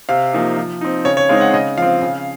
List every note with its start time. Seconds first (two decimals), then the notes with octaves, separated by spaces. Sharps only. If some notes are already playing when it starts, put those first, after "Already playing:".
0.09 C3 F5
0.33 F3 A#3 D#4
0.57 F3
0.81 C4 D#4
1.05 C#3 C#5
1.17 C#5
1.29 G#3 C4 D#4 F5
1.41 F#5
1.54 C#3 D#5
1.78 F3 C4 F5
2.02 C#3